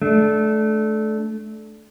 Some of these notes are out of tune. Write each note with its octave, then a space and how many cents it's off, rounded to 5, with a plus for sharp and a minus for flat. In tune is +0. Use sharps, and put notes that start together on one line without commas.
A3 -20 D4 +0